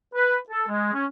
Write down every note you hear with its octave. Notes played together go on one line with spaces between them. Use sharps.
B4
A4
G#3
C#4